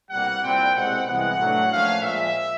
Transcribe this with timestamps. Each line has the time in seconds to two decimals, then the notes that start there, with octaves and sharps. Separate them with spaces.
0.10 C2 B2 G3 A#3 F#5
0.43 A#2 G3 C4 E4 G5
0.74 C2 B2 G#3 C4 F#5
1.06 C2 C3 E3 G#3 B3 F#5
1.38 A2 F#3 A3 D4
1.71 A#2 F3 A3 C#4 F5
2.02 A#2 F3 G#3 E5